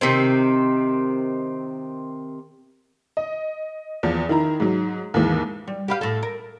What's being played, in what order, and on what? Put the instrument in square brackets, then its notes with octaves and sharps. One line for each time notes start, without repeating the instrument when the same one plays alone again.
[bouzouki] C3 D#3 C4
[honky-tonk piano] D#5
E2 F3
D#3 E4 A#5
G#2 F#3
D#2 G#2 E3
[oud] G3
G4 B4 F5
A2 A4
A#4